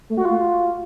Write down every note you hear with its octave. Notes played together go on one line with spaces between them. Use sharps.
A3
F#4
F4